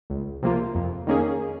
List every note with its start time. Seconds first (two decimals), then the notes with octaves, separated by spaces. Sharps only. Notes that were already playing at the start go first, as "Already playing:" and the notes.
0.10 C#2
0.43 C3 F3 A#3 F4
0.75 F2
1.07 D#3 A#3 C#4 G#4